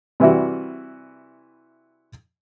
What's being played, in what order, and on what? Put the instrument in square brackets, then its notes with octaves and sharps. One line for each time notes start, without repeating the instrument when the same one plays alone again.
[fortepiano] C3 E3 G3 E4 F#4